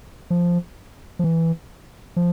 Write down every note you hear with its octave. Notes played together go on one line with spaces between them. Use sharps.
F3
F3
E3
F3